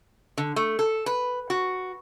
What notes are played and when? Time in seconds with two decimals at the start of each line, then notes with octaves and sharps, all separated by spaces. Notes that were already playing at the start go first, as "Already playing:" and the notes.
0.38 D3
0.56 A3
0.79 A4
1.06 B4
1.50 F#4